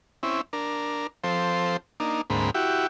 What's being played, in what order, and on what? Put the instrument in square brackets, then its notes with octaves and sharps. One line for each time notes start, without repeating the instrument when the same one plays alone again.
[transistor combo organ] C4 C#4 E4
D4 A#4
F3 C4 A4 C5
A#3 D4 D#4
D2 G#2 A#3 C4 B5
E4 F#4 G4